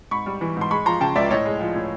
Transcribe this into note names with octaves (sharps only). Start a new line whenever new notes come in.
G#2 B5 C#6
G3
E3
G#2
C6
G#3 B5 C#6
F3 A#5 C6
C#3 G5 A5
C#2 D5 E5
A2 C#5 D#5
G#3
F3
A2